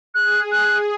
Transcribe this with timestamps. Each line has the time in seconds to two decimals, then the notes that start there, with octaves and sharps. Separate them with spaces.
0.15 G#4 F#6
0.52 F#6